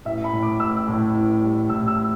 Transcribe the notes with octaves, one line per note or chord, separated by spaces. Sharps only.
A1 E5
B5
A2
D6
A1 E6
A2
A1
G3
A2 E6
E6